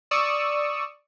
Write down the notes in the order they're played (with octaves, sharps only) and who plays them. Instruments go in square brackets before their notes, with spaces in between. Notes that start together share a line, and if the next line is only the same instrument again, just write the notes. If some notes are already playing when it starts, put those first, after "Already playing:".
[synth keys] D5 C#6 D#6 E6